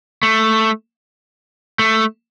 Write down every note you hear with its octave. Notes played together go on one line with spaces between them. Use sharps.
A3
A3